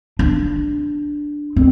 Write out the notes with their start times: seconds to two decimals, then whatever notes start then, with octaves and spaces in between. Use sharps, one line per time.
0.19 D4
1.56 C4